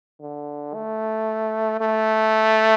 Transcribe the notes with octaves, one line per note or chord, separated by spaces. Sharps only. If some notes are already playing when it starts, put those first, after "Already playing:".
D3
A3
A3